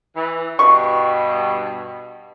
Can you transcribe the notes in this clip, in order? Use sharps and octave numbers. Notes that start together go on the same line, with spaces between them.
E3
G2 B2 C#6